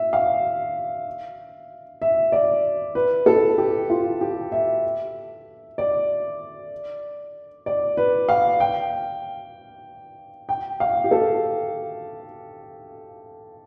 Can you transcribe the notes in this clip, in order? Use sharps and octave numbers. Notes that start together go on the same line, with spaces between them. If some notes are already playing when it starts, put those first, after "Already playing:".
Already playing: E5
F5
E5
D5
B4
A4
G4
F4
G4
E5
D5
D5
B4
F5
G5
G5
F5
G4
A4